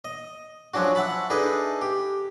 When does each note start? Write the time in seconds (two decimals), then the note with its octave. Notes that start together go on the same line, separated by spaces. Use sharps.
0.05 D#5
0.74 F3 F#3 C#4 D4 F#4
0.95 E5 F#5 A5 B5
1.30 D4 D#4 G#4 A4 B4 E5
1.82 G4